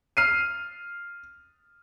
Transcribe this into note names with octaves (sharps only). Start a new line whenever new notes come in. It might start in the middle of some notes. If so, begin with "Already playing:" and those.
F6 C7 D#7